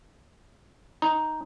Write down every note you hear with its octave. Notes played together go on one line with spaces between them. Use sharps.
D#4